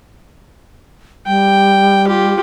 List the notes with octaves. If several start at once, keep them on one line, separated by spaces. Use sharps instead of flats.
G3 G5
F4 G4